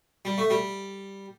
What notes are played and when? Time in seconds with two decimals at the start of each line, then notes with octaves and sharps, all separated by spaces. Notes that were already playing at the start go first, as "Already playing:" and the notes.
0.25 G3
0.38 A3
0.50 G3